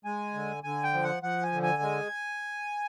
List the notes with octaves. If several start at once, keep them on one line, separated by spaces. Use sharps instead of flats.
G#3 G#5
D3
D3 G#5
G5
F3
F#5
F3 F#5
G#5
D3
G#5
G#3